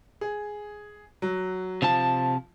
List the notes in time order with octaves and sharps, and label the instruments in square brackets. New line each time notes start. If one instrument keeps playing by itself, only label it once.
[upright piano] G#4
F#3
[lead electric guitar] C3 A5 [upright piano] F3